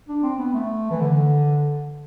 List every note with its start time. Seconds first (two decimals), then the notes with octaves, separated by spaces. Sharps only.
0.09 D4
0.23 C4
0.39 B3
0.54 A3
0.91 E3
1.01 D3